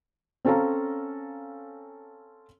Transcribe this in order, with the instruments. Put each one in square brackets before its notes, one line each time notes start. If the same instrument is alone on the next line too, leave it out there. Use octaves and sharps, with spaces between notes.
[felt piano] C4 C#4 A4 C#5 F5 A#5